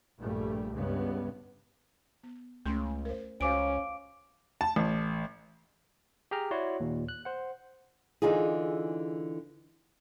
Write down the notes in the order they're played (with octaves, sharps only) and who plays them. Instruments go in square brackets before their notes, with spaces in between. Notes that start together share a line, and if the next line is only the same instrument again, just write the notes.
[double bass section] A#1 G2 G3 A3
C#2 G2 C#3 B3
[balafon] B3
[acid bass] C#2 [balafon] A3 C#4 C6
[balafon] A#4 C5
[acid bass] C#2 [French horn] C#4 [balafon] F#4 C5 G#5 [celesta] F5 D6 D7
[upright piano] A5
A1
[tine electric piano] G4 G#4 G5 A#5 F6
E4 F#4 C#5 D5 F#5 C6
D#2 A#2
F#6
C5 F#5
[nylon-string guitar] D3 E3 D#4 F4 G#4